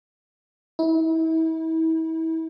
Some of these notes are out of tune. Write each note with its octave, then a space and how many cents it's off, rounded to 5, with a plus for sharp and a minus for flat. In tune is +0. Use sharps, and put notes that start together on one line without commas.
E4 -35